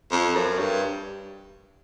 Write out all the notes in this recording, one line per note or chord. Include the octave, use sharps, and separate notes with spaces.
F2
F#2
G2